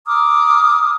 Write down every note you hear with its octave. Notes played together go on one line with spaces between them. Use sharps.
A#5 D6 D#6 F6